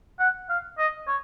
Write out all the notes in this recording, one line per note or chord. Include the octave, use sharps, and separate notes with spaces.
F#5
F5
D#5
C#5